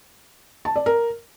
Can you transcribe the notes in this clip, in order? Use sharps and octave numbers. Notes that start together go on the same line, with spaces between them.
A5
D5
A#4